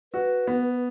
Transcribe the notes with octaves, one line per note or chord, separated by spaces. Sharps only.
F#4 B4
B3